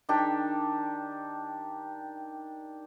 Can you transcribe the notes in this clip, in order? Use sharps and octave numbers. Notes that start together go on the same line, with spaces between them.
D#3 D4 G4